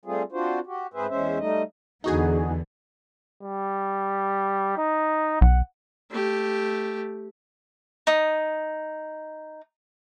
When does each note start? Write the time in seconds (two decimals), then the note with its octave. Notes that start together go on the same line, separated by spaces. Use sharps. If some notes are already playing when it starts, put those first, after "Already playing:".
0.05 G3 A3 C4 F4 G#4
0.32 C4 D4 F4 F#4 C5
0.67 F#4 G4
0.94 G#2 C4 G#4 B4 C5 E5
1.09 E2 G#3 C#4 C5 E5
1.39 G3 A3 D#4 D#5
2.04 E2 D3 B3 D#4 F#4 G#4
3.43 G3
4.77 D#4
5.41 B1 F#5
6.11 A3 G4
8.07 D#4 D#6